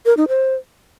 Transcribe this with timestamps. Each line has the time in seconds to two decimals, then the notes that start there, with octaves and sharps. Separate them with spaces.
0.06 A#4
0.17 D#4
0.29 C5